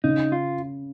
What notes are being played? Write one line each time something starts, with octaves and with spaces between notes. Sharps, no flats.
C#3 D#4
F4